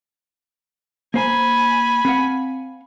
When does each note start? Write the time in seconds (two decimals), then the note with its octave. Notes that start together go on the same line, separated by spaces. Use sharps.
1.14 A#3 C5 G#5 A#5 B5
2.05 C4 F5 F#5